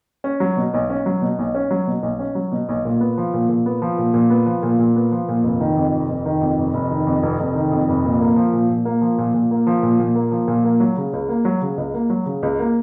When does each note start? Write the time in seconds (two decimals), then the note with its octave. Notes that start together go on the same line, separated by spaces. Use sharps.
0.24 C#4
0.40 F#3
0.57 B2
0.74 B1
0.90 C#4
1.06 F#3
1.22 B2
1.39 B1
1.55 C#4
1.71 F#3
1.87 B2
2.03 B1
2.19 C#4
2.35 F#3
2.52 B2
2.69 B1
2.85 A#2
3.00 B3
3.17 F3
3.33 A#2
3.49 A#2
3.66 B3
3.82 F3
3.98 A#2
4.14 A#2
4.30 B3
4.46 F3
4.63 A#2
4.79 A#2
4.96 B3
5.12 F3
5.29 A#2
5.44 F1
5.60 D#3
5.77 F2
5.93 F1
6.09 F1
6.25 D#3
6.41 F2
6.58 F1
6.74 F1
6.91 D#3
7.07 F2
7.23 F1
7.40 F1
7.55 D#3
7.72 F2
7.88 F1
8.04 A#2
8.20 A#3
8.36 F3
8.53 A#2
8.69 A#2
8.85 A#3
9.01 F3
9.18 A#2
9.34 A#2
9.51 A#3
9.67 F3
9.83 A#2
9.99 A#2
10.15 A#3
10.32 F3
10.48 A#2
10.64 A#3
10.80 F#3
10.97 C#3
11.13 C#2
11.29 A#3
11.45 F#3
11.61 C#3
11.78 C#2
11.94 A#3
12.10 F#3
12.26 C#3
12.43 C#2
12.60 A#3